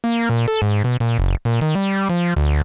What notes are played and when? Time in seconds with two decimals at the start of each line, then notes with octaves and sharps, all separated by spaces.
0.04 A#3
0.30 A#2
0.48 A4
0.62 G#2
0.84 B2
1.00 A#2
1.19 F#1
1.45 A#2
1.61 D#3
1.75 G3
2.09 F3
2.37 D2